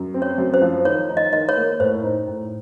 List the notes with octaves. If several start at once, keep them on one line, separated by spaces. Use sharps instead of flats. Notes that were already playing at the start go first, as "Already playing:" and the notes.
Already playing: F#2
C4
C#5
F#2
C5
F3
D#3 C#5
D#4
D#5
D#3 D#5
C#5
A#3
A2 C5
D#4
A2